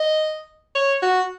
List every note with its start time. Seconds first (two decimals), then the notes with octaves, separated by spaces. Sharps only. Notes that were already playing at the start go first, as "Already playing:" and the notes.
Already playing: D#5
0.75 C#5
1.02 F#4